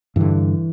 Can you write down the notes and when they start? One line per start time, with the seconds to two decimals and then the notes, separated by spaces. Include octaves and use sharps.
0.16 G2 D3 E3